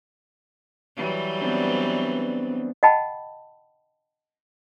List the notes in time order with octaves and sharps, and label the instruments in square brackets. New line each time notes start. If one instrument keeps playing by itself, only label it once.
[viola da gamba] E3 F#3 G3
[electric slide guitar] B3 C4 D4
[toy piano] D#5 F#5 G5 A5 B5